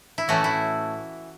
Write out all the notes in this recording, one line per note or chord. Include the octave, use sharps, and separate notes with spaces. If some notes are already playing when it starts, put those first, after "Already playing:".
E4
A2 E3 A3 C#4 F#4
E4